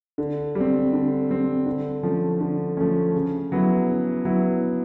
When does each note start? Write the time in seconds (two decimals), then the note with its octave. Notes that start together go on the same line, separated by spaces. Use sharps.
0.18 D3
0.55 G3 C4
0.93 D3
1.29 G3 C4
1.66 D3
2.03 F3 A3 C#4
2.40 D3
2.77 F3 A3 C#4
3.15 C#3
3.52 F#3 B3 E4
3.89 C#3
4.25 F#3 B3 E4